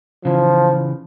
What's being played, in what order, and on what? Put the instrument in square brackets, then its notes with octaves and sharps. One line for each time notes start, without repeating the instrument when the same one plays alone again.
[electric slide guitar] C#3 E3 [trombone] F3